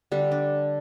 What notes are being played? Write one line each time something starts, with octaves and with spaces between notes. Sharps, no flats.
D3 G3 D4
D4